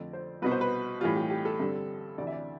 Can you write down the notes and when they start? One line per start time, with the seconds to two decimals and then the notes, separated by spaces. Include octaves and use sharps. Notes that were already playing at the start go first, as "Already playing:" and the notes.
Already playing: F2 D3 A3 D5
0.13 C5
0.42 C2 B2 B3 B4
0.51 C5
0.61 B4
1.01 A2 E3 G3 F4
1.16 G4
1.30 G4
1.45 A4
1.60 G2 D3 G3 C4
2.18 D2 C3 E3 D5
2.27 E5
2.33 D5